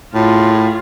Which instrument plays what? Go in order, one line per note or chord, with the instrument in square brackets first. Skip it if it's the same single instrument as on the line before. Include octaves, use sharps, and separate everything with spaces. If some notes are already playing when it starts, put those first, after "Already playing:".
[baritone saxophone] A2 [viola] F4 G#4